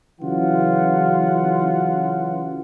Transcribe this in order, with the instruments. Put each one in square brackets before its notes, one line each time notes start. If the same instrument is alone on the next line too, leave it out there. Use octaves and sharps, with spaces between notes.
[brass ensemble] C#3 E3 F#3 F4 F#5